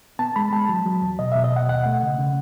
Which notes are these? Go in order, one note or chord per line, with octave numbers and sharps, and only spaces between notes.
B3 A5
G#3 B5
G#3 A5
F#3
F#3
E2
B2 D#5
E5
B2
D#5
B2 F#5
D#2 F#5
A3
C#3
C#3